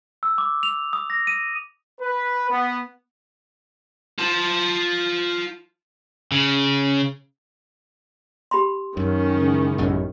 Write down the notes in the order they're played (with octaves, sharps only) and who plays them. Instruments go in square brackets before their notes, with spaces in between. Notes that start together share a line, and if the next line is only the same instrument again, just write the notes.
[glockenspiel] E6
D6
F7
D#6
A#6
D#7
[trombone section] B4
B3
[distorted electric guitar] F4 A5
[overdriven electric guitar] C#3
[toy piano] G4 B5 C6
[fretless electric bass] F#2 [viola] D#3 C#4
[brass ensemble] C#3 E3 G#3
[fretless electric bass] A1 F#2 B2